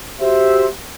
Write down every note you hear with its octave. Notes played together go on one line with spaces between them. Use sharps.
F#4 G4 C5 E5